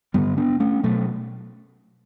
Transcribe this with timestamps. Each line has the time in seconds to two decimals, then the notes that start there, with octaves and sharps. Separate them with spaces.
0.14 G2 D3 G3 B3
0.38 B3 D4
0.60 A3 C#4
0.83 B2 F#3 A3